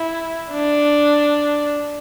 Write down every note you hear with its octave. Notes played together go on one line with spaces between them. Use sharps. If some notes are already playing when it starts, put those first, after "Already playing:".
Already playing: E4
D4